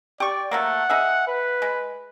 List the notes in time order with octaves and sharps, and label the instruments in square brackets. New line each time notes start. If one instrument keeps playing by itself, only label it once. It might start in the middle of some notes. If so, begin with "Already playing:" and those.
[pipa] G4 C#6 [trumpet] D5
[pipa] F#3 A3 A#3 [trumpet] F#5
[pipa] D#4 G#4 E5
[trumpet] B4
[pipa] G#3